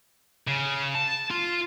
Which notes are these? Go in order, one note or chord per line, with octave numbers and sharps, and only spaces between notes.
C#3
A5
F4